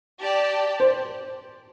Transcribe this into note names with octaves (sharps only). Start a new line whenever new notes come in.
G4 D5 A5
C5